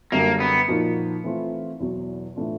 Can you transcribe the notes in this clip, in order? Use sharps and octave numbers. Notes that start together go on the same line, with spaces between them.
F#2 D3 G3 A#3
B3
A#2 F3 A#3 D#4 F#4
E3 A3 C4 F4
E2 B2 F#3
A2 E3 A3 D4 F4